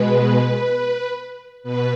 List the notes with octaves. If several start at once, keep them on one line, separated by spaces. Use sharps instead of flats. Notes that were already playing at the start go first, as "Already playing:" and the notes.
Already playing: B2 G#3 B4
B2 B4